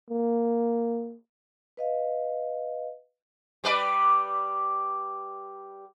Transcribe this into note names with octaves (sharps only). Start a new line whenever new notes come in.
A#3
B4 D#5 F5
G3 B4 D5